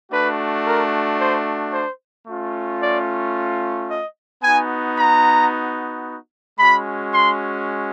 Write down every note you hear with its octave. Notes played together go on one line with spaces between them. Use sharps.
A3 D4 F#4 B4
A#4
C5
C5
A3 C#4 F4
D5
D#5
B3 D#4 F#4 G#5
A#5
G#3 C#4 F#4 B5
C6